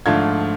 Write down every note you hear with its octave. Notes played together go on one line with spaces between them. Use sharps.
G#2 F3 A3 D4 F4 G#6